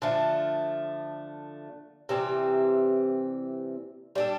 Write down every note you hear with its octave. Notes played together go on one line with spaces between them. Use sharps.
D3 F3 A3
C3 E3 G3 C4
G3 D4 A4